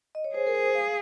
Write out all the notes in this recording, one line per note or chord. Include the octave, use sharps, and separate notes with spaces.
D#5
C#5
G#4 C5
A#4
C5
F5